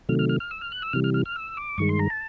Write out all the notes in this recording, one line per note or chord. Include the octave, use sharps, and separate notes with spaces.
C3 D#3 F#3 A3 F6
F6
F6
F6
E6
F6
F#6
E6
C3 E3 G3 F6
F6
F6
F6
E6
D6
G2 D#3 G#3 C#6
C6
A#5
A5